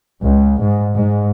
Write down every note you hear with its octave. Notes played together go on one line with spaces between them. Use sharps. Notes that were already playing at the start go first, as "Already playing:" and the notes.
C#2
G#2
G#2